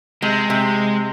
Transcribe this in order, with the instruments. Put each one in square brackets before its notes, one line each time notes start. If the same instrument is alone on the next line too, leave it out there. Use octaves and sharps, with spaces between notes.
[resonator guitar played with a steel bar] C3 [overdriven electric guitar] G#3
[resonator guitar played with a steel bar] C3